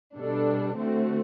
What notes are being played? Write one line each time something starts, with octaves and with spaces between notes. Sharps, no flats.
B2 G3 D4 A4
D3 A3 C4 F#4